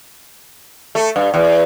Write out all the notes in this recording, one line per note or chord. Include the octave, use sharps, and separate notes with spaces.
A3
G2
E2